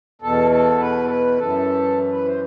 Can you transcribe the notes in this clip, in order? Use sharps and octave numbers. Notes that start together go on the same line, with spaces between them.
E2 B2 A4
A4
B4
A4
B4
F#2 E3 A4
B4
C5